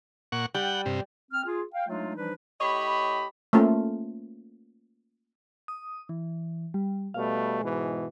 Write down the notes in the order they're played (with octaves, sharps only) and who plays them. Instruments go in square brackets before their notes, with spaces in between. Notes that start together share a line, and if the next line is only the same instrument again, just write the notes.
[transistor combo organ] A#2 F#5 C#6
[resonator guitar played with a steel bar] G3 [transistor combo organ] F#5 G5
[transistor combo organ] G2 C3
[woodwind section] C4 F6
F4 G#4
F5 G5
F#3 G#3 A3 D4 D#4 F4
E3 F3 G3 D4 D#4 B4
[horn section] A2 G4 C#5 D#5 B5
[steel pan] A3 A#3 C#4 F4
[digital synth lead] D#6
E3
G3
[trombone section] B2 G3 A3 [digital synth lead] F5
[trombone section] G#2 B2 E3 [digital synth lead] G#3